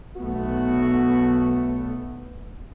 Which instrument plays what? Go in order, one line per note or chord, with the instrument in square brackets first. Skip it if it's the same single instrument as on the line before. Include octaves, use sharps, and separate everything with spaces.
[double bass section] B1 A3 B3 [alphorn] F#4